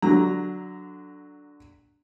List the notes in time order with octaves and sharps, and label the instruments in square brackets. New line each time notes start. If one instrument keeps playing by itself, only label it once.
[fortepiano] D3 F#3 A#5